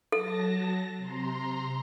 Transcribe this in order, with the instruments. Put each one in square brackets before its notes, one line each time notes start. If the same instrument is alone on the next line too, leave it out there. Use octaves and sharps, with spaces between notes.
[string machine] F#3 A5 A#6 [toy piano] A4
[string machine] C3 A#5 C6